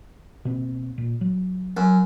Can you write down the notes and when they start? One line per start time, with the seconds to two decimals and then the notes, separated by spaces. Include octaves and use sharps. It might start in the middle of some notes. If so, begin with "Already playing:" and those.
0.45 B2 A#3 C4
0.98 A#2
1.21 F#3
1.77 F#2